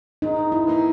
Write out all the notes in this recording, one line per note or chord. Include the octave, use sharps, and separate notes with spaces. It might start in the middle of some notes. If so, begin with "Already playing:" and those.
G#2 D#4
E4
E3 A#3 D#4